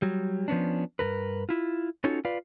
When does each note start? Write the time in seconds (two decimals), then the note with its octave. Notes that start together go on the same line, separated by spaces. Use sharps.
0.02 F#3 G3
0.48 F3 B3 C#4 D4
0.99 G2 B2 A#4 B4
1.49 E4 F4
2.04 C#4 D#4 F4 F#4 A4 C#5
2.25 F4 B4 D5 F5